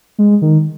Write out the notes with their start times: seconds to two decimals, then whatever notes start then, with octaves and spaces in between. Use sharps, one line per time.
0.18 G#3
0.42 D#3